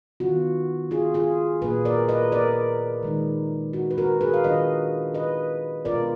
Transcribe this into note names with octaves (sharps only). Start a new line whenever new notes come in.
D#3 F#3 B3 F4 F#4
F4 G#4
F4 G#4
A#2 F#3 A#3 F4 G#4 B4
A#4 D5
B4 D#5
A#4 D5
D#3 G#3 D#4
F#4
B4
F#4 A#4
G#4 B4
F5
D#3 F#3 D4 F4 B4 D#5
B4 D#5
B2 G#3 B3 F4 A#4 D5